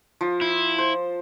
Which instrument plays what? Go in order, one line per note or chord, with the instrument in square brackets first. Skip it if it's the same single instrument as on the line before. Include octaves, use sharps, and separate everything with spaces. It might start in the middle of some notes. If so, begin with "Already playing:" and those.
[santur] F3
[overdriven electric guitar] E4
[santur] C5